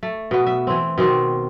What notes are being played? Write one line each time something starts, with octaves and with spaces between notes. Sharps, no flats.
A3
B2 B3
E5
E3 C4
B2 D#3 C4